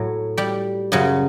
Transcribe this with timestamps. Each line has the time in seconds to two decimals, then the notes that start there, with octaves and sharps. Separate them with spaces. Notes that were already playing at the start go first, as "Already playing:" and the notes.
Already playing: A2 F#3
0.37 G3 G4
0.92 F#2 C#3 F#3